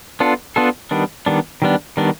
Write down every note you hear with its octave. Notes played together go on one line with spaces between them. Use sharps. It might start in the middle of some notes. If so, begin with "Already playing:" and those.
B3 D4 F4 A4
B3 D4 F4 A4
D#3 G3 B3 D4
D#3 G3 B3 D4
D#3 G3 B3 D4
D#3 G3 B3 D4